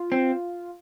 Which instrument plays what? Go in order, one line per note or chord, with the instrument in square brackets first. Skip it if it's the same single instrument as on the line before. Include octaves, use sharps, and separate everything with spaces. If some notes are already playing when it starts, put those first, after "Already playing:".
Already playing: [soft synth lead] F4
[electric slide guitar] C4